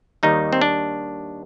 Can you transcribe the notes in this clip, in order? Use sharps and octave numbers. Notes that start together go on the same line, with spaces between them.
D#2 D#3 G3 D#4
C4
D4